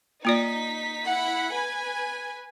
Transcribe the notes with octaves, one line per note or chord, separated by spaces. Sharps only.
A#3 D#4 F4 D5 B6
E4 F#5 B5
B4 G#5